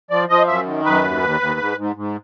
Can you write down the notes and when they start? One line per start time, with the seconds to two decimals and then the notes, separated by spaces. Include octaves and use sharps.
0.10 F3 D5
0.29 F3 D#5
0.47 F#2 E5
0.66 D#3
0.85 F#2 B4
1.04 D#2
1.22 D#2
1.40 D#2
1.59 G#2
1.78 G#2
1.96 G#2